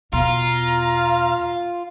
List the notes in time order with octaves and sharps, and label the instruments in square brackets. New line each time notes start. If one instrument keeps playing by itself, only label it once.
[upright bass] E2 B2 [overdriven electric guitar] F4 [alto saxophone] F5 [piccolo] A#5